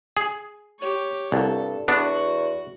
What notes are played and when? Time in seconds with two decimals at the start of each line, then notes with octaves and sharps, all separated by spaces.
0.17 G#4
0.79 G4 C#5
1.32 C2 G2 A4
1.88 E2 B3 D4 F#4